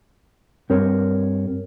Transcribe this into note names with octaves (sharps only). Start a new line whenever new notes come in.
G2 C4 A#4 C#5